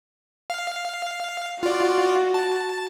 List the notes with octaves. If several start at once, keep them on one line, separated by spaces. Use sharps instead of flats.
F5
F4 F#4 D5
A5